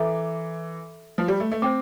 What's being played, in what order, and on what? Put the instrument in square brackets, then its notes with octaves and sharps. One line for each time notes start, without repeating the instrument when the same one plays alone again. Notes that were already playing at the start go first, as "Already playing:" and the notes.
Already playing: [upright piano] E3 [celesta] A4 E5 A#5 D6
[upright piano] F3
G3
A3
A3
[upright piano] C4 [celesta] C5 G5 D6